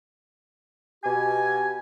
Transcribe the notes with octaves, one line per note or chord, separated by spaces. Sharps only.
B2 G4 G#5